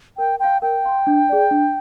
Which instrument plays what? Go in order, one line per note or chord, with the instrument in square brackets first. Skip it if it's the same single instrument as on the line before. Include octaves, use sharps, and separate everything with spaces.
[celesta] A#4 [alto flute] G5
[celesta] F5 C6 [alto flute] G5
[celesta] A#4 [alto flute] G5
[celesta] F5 C6
D4
G#4 D5
D4